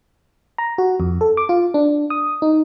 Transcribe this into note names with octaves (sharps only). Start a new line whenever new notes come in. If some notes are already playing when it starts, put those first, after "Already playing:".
A#5
F#4
F2
A4
D6
F4
D4
D#6
D#4